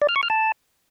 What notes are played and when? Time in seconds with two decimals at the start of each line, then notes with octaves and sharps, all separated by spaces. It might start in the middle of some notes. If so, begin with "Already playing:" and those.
0.02 D5
0.09 F6
0.16 C#6
0.23 F6
0.30 A5